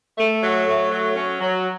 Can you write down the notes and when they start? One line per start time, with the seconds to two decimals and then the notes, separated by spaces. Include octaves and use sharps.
0.18 A3
0.43 F#3
0.67 A3
0.92 F#3
1.16 C#4
1.41 F#3